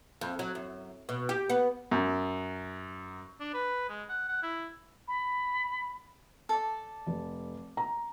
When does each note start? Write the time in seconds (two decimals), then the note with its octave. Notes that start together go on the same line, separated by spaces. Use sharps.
0.21 F2
0.39 F#3
0.55 F#2
1.09 B2
1.29 G4
1.50 B3
1.91 F#2
3.40 D4
3.54 B4
3.89 G#3
4.09 F#5
4.28 F#5
4.43 E4
5.08 B5
6.49 A4 D5
7.07 F1
7.77 A#5